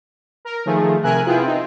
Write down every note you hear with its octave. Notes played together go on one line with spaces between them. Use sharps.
A#4
D#3 F3 A3 G#4
C3 A#4 E5 G#5 F#6
B3 E4 F4 G#4 E5 G5
C4 D#4